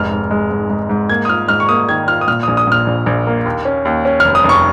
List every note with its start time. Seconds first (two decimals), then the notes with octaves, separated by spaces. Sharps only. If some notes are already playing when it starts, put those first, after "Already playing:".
Already playing: F1 G#2 F6
0.12 G#2
0.31 G#3
0.50 G#2
0.70 G#2
0.89 G#2
1.09 A#3 G#6
1.25 D#6
1.29 F4 F6
1.48 G#2 F6
1.60 C#6
1.69 A#3 D#6
1.89 D#3 G#6
2.08 F4 F6
2.21 D#6
2.28 A#2 F6
2.43 A#1 D#6
2.57 D#6
2.67 A#2 F6
2.87 A#1
3.06 A#1
3.27 A#3
3.45 D#2
3.65 C#4
3.85 D#2
4.05 C#4
4.20 F1 F6
4.35 D#6
4.44 F1 C#6